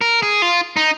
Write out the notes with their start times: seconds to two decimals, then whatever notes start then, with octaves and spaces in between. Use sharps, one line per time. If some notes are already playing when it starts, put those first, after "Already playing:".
0.01 A#4
0.23 G#4
0.42 F4
0.77 D#4